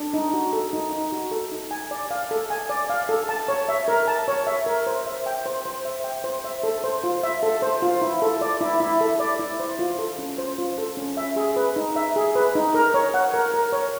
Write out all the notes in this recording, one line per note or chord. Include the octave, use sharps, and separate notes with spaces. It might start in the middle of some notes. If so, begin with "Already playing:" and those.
Already playing: D4
D#4
F#4
A4
D#4
D#4
F#4
A4
D#4
G#5
D5
F5
A4
G#5
D5
F5
A4
A5
C#5
E5
A#4
A5
C#5
E5
A#4
C5
E5
G5
C5
C5
E5
G5
C5
E5
A4
C5
F4
E5
A4
C5
F4
E4
A4
D5
E4
E4
A4
D5
E4
C5
F4
A4
C#4
C5
F4
A4
C#4
E5
G#4
B4
D#4
E5
G#4
B4
D#4
A#4
C#5
F#5
A#4
A#4
C#5